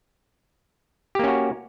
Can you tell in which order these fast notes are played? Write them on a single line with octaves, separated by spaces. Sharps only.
G4 A#3 C#4 F#4